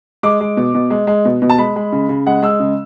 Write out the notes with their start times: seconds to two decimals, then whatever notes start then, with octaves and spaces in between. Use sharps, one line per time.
0.23 G#3 D6
0.40 G#3
0.57 B2
0.75 B2
0.90 G#3
1.07 G#3
1.25 B2
1.42 B2
1.49 A5
1.58 G#3 B5
1.76 G#3
1.92 C#3
2.09 C#3
2.27 G#3 F#5
2.42 G#3 E6
2.60 C#3